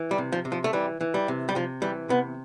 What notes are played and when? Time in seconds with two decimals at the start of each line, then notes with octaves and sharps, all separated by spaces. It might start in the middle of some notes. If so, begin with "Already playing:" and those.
Already playing: E3
0.11 G3
0.18 C3
0.32 F3
0.45 C3
0.52 F3
0.64 A3
0.73 E3 G3
1.01 E3
1.14 G3
1.28 C3
1.49 G3
1.55 C3 F3
1.82 E3 G3
2.09 C3 B3